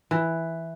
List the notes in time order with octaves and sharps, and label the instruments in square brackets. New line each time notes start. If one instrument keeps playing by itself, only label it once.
[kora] E3